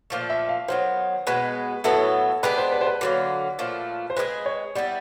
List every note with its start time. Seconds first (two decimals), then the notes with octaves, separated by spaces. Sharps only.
0.10 A#2 F3 A3
0.30 E5
0.49 F5
0.68 D#3 F#3 B3 C5
1.27 B2 G#3 B3 B4
1.84 A2 F#3 B3 E4 A4
2.43 G#3 B3 D4 G4 B4
2.58 C5
2.72 B4
2.81 C5
2.87 B4
3.01 D3 F#3 A#3
3.59 A#2 F3 A3
4.10 C5
4.17 G#3 C4 E4 G#4 B4
4.46 C#5
4.75 G3 B3 E4 D5